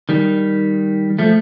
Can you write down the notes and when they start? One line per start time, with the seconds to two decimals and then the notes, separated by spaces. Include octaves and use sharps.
0.09 D#3 G3
1.19 F3 A3